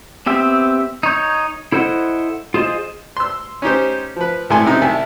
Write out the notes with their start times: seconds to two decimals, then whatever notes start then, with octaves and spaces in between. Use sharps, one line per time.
0.26 B3 C4 G4 E5
1.03 D#4 C#5 G6
1.72 E4 A4 C5 D#5 F#5
2.54 F4 G#4 C5 D#5
3.17 C6 E6
3.62 C#4 D#4 G4 C5
4.16 F3 B4
4.50 C2 A2 G#3 E4 G#5 C6
4.65 F#2 C3 D#4
4.82 C2 E5 G#5 A5